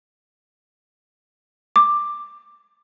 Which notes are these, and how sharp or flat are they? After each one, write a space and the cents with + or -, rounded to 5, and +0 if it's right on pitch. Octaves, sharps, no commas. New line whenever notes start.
D6 +10